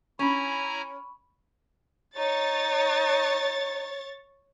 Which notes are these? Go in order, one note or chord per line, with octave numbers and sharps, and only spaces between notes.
C#4 E4 G#5 A#5 B5 C#6
D#4 C#5 A6